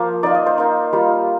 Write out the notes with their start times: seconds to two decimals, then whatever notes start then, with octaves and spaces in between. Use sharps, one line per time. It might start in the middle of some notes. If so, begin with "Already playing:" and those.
Already playing: F3 A#3 C5
0.23 A#3 D#4 D5
0.34 D#5
0.46 C5
0.58 A#3 D#4
0.93 G3 A#3 F4